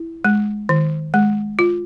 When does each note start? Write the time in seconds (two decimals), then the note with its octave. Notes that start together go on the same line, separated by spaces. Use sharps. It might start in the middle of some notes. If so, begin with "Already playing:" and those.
Already playing: E4
0.25 G#3
0.69 D#3
1.14 G#3
1.59 F4